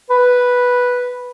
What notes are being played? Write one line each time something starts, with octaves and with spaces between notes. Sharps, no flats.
B4